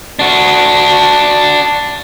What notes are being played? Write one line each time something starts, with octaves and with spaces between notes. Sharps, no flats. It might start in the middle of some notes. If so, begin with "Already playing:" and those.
D4 F#4